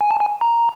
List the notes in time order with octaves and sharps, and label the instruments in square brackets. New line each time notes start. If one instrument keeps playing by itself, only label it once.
[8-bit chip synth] G#5
A5
G#5
A#5